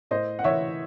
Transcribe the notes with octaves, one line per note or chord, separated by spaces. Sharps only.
A2 C5 D#5
F#5
E3 C#5 E5